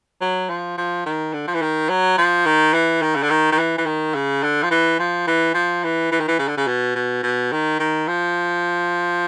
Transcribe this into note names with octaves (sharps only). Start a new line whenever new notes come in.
F#3
F3
F3
D#3
D3
F3
E3
D#3
F#3
F3
D#3
E3
D#3
C#3
D3
D#3
D#3
E3
E3
D#3
C#3
D3
F3
E3
F3
E3
F3
E3
E3
D#3
E3
C#3
D3
C#3
B2
B2
B2
D#3
D#3
F3